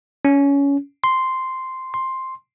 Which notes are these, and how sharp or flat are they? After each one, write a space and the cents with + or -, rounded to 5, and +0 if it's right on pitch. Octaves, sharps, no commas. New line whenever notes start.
C#4 +20
C6 -5
C6 +5